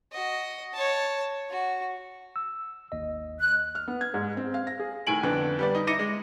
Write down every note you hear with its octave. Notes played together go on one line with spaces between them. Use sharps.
F#4 D#5
C#5 A5
F#4
E6
G#1 D#2 D#5
F#6
F6
B3
G#6
G#2
C4
F5
A#6
G#4
A2 D#3 G#5 D7 F#7
F2 D3 B3
G3 B3 D5
D#4
D#4 E4 D6 A#6 C#7 D#7
G#3